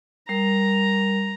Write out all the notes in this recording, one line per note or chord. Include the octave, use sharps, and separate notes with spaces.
G3 A#4 A#5